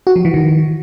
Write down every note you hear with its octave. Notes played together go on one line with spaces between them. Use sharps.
F#4
F3
E3
D#3